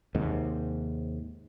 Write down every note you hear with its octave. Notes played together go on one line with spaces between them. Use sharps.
D#2 G#2 C3